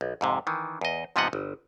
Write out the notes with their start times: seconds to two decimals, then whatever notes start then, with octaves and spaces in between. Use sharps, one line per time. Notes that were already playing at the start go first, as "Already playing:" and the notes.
0.01 B1
0.21 F2 G#2 C3
0.47 D#3 E3
0.81 E2 D#5
1.16 G#2 C3 F3 B3 D#5 F#5
1.33 G1